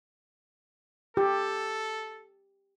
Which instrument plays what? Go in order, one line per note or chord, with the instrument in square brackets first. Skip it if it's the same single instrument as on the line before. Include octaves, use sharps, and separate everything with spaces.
[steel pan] G4 [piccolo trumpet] A4